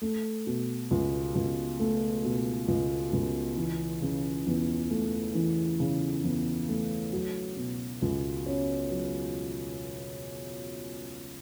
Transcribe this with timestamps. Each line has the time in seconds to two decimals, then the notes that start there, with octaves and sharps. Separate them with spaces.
0.02 A3
0.47 B2
0.91 C#2
1.35 C#2
1.80 A3
2.24 B2
2.68 C#2
3.13 C#2
3.57 E3
4.02 C#3
4.46 E2
4.90 A3
5.35 E3
5.80 C#3
6.24 E2
6.68 A3
7.13 F#3
7.57 B2
8.02 C#2
8.46 C#4
8.90 F#3